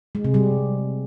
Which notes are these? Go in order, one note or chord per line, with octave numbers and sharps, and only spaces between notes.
G#3
C3
G3